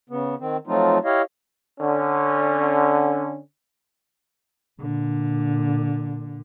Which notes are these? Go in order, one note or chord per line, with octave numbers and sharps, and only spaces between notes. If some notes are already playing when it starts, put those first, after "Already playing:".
C#3 B3
D#3 C4
F3 F#3 A3 C4 D#4 F4
E4 G4 C#5 D#5 F5
D3 C#4
A#2 D3